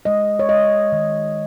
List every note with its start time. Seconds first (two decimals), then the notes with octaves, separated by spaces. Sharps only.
0.05 G#3 D#5
0.39 C#5
0.49 G#3 D#5
0.92 D#3